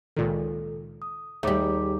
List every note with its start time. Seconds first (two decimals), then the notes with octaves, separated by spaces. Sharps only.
0.16 C#2 A#2 D#3 A4
1.02 D#6
1.43 D#2 G3 A3 G#4 D6